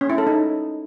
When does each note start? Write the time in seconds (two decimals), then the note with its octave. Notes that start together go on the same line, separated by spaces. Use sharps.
0.01 C#4
0.10 E4
0.18 A4
0.27 D#4